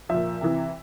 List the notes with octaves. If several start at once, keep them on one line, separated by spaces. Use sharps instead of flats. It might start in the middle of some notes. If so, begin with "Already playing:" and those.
A#2 F3 E5
C3 E3